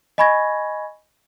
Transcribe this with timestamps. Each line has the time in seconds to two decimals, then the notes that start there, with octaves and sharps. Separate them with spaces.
0.18 D#5 G#5 B5 C#6 G#6 A#6